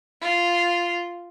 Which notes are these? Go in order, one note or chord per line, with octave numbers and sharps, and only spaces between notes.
F4